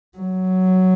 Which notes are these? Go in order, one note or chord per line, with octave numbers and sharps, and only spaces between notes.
F#3